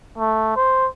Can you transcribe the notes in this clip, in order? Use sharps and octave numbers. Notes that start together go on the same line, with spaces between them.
A3
C5